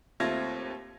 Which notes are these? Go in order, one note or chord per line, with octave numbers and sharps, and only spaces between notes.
D#2 A3 C4 F4 G#6 A#6